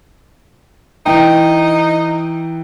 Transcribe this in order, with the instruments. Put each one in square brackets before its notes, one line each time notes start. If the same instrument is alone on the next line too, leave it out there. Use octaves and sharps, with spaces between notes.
[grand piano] E3 G5 [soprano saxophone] D#4